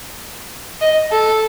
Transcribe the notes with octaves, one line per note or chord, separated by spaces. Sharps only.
D#5
A4